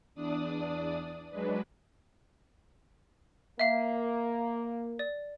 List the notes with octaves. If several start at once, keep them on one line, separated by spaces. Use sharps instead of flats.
E2 D4 D5 D#6
F#3 G#3 D4 B4
A#3 E5 F5
D5